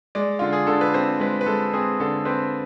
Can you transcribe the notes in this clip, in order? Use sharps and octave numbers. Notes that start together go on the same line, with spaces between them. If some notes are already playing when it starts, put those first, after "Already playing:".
G#3 D5
D3 F4
G#4
D3 A4
B4
C4 C5
G#3 B4
B4
G#3 A4
C4 G#4
D3 A4
C4 B4